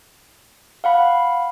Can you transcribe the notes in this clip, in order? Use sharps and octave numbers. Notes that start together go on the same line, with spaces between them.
F5 F#5 B5